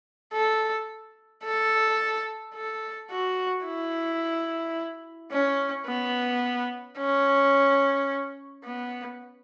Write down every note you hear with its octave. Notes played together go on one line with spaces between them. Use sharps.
A4
A4
A4
F#4
E4
C#4
B3
C#4
B3